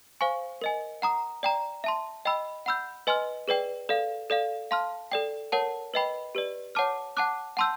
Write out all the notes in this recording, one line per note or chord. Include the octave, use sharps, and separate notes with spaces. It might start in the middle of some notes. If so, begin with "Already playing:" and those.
C5 F5 G#5 C#6
A#4 D#5 G#5
F#5 A#5 D#6
D5 G5 A#5
E5 A5 C6
D#5 G5 B5 E6
F#5 B5 E6 G6
B4 D#5 G#5 C6 F6
G#4 B4 D5 G5
A4 D5 F5
A4 D5 F5
F5 A5 C6 F6
A4 D5 G5
A#4 C#5 F#5 A5
B4 D#5 G5 B5
G4 B4 D5
C#5 F#5 A5 D6 F6
F#5 A5 D6 F#6
F#5 A5 C6 E6 G6